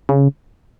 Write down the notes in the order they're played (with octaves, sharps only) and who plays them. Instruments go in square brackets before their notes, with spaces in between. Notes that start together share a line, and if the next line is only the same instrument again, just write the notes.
[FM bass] C#3